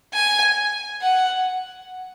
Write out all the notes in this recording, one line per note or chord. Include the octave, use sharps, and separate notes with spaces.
G#5
F#5